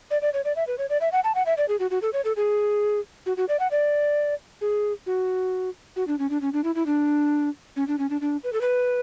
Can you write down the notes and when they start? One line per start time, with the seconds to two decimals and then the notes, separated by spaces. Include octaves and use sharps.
0.11 D5
0.22 D5
0.34 C#5
0.45 D5
0.56 E5
0.67 B4
0.78 C#5
0.90 D5
1.01 E5
1.12 F#5
1.24 A5
1.35 F#5
1.46 E5
1.58 D5
1.68 G#4
1.80 F#4
1.91 F#4
2.02 A4
2.13 C#5
2.25 A4
2.37 G#4
3.26 F#4
3.37 F#4
3.49 D5
3.60 F#5
3.71 D5
4.61 G#4
5.06 F#4
5.96 F#4
6.08 D4
6.19 C#4
6.30 D4
6.42 C#4
6.53 D4
6.64 E4
6.75 E4
6.86 D4
7.76 C#4
7.88 D4
7.99 C#4
8.10 D4
8.21 D4
8.44 B4
8.53 A4
8.61 B4